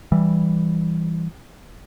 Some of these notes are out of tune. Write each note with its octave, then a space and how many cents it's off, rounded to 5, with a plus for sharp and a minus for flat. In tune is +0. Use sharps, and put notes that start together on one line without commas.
E3 +0 G3 +0